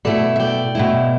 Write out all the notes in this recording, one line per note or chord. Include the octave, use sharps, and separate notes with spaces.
B2 A3 E4 A4 D5
E5
D5 G5
B2 A3 E4